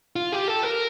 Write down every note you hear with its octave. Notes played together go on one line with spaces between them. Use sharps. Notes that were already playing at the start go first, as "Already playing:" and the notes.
F4
G4
A4
A#4